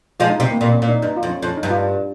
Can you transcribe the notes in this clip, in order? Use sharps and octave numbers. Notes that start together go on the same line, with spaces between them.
F3 G#3 F4
D#4
C3 C4
A#3
A#2 A#3
C#4
A#2
D#4
G2 D#4
F4
F2
C#4
F2 C#4
D#4
G2
F4